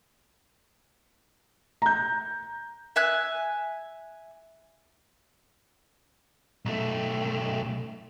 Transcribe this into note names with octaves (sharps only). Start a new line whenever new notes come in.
A#5 G6
E5 G#5 F#6
B1 A3